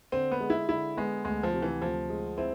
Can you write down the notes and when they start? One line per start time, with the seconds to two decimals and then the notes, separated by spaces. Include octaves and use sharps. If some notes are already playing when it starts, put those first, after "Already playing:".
0.12 D3 C4
0.31 B3
0.40 G#3
0.50 E4
0.69 D3 E4
0.97 G#3 B3
1.25 D2 G#3
1.43 F3
1.53 C3
1.62 E3
1.82 D2 F3
2.10 G#3
2.37 C4 E4